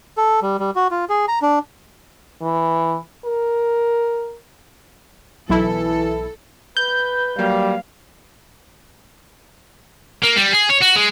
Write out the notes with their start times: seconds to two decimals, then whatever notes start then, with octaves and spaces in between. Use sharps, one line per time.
0.17 A4
0.42 G3
0.60 G3
0.76 F#4
0.91 F4
1.09 G#4
1.28 A#5
1.42 D4
2.42 E3
3.25 A#4
5.49 B1 E3 E4 A4
6.77 B4 G6
7.39 F#3 G3 A#3 F5
10.23 A#3
10.36 G3
10.52 G#4
10.69 C#5
10.81 F#4
10.95 G#3